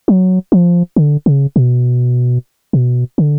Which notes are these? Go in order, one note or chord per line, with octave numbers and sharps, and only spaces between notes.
F#3
F3
D3
C#3
B2
B2
D3